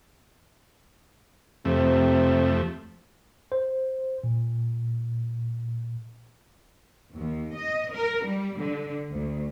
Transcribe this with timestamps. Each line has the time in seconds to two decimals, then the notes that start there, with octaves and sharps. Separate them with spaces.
1.65 F2 C3 A3
3.52 C5
4.24 A#2
7.15 D#2
7.56 D#5
7.93 A#4
8.25 G3
8.59 D3
9.11 D2